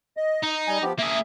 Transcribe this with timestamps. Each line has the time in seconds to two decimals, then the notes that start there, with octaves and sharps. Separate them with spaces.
0.17 D#5
0.44 D#4
0.68 G3 G#5
0.82 F3 B3 G4
0.99 A#3 G#4 E5